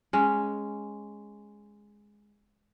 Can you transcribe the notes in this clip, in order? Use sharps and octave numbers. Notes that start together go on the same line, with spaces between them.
G#3 C#4